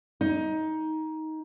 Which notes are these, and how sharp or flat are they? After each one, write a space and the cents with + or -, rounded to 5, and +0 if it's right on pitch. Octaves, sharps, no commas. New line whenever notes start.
D#4 +15